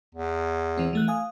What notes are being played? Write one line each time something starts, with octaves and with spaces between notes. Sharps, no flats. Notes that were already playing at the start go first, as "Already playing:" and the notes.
E2
E3 C4
E3 A3 F#6
F5 G#5 D#6